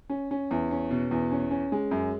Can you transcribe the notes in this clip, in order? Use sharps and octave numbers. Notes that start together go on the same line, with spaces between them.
C#4
C#4
E2
C#4
B2
E2
C#4
C#4
G#3
F#2